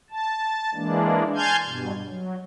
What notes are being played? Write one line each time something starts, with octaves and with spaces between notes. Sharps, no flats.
A5
E3 G#3 A#3 D4
G#5 A5 C6 F6 G6 G#6
G2 B2
F#3